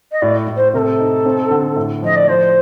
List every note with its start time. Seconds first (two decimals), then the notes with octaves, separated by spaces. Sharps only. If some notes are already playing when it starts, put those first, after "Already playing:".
0.12 D#5
0.22 A2 D5
0.47 A2
0.56 C5
0.73 C3 A#4
0.78 A4
0.99 D#4
1.25 C4
1.51 D3
1.76 A2
2.02 F3 D#5
2.16 D5
2.28 F3 C5